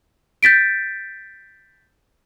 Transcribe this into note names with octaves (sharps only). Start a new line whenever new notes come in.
G6 A6 B6 D7